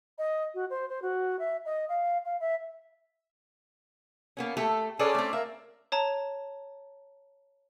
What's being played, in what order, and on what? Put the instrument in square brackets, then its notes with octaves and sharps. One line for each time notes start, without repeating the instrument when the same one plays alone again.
[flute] D#5
F#4
C5
C5
F#4
E5
D#5
F5
F5
E5
[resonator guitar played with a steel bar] A#3 B3 C#4
A3 G4 A4
[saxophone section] C#4 D5 [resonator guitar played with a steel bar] G#4 A4 B4
[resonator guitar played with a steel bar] A3 C4
[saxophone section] A#3 [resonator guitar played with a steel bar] E5
[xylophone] C#5 A5 A#5